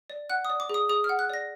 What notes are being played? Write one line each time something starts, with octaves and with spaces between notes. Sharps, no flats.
D5
F#5 F#6
D#6
D5
D6
G#4 D#6
G#4 D#6
F6
F#5
F#6
D5 A#6